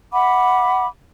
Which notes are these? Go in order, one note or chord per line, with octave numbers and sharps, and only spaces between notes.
E5 F#5 B5 D6